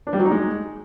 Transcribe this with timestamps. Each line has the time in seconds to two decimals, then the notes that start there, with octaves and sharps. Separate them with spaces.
0.07 D4
0.13 G3
0.19 F#3
0.25 D#4
0.32 G#3